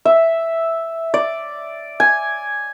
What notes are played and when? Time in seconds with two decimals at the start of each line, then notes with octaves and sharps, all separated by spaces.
0.05 E5
1.14 D5
2.00 G#5